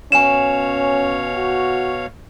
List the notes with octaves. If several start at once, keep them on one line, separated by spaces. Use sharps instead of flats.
B2 C#4 C#5 F5 G#5 E7
F#4